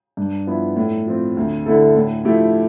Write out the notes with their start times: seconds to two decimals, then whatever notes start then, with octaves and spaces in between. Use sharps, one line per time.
0.17 G2
0.47 F3 B3 E4
0.76 A2
1.07 F3 C4
1.37 D2
1.66 D3 A3 E4 A4
1.95 A2
2.25 F3 A3 E4 G4